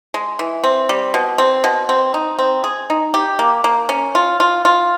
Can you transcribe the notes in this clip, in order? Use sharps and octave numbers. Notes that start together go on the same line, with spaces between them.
G#3
E3
C4
G3
B2
C4
B2
C4
D#4
C4
G#4
D#4
G4
A#3
A#3
C#4
F4
F4
F4